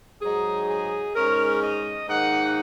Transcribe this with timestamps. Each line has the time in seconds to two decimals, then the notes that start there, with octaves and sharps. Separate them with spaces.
0.22 G#2 F#3 D#4 G#4
0.69 G#4
1.15 G#2 G#3 C#4 A#4
1.63 D#5
2.08 G#2 D#3 A#3 D#4 F#5